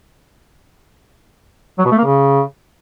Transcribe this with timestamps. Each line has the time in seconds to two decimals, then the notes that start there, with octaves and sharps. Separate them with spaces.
1.79 F#3
1.85 B2
1.92 A3
1.98 A#3
2.05 C#3